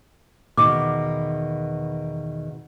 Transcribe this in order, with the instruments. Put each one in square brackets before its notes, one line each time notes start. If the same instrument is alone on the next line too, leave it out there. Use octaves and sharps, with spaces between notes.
[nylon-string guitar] E2 B2 D#3 [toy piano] D6